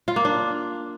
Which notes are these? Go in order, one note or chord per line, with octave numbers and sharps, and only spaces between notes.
F4
A#3
D4